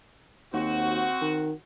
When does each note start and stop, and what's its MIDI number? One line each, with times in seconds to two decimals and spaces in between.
0.54 1.08 39
0.54 1.57 60
0.54 1.57 66
1.22 1.52 51